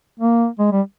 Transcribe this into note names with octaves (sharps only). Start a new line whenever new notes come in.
A#3
G#3
G3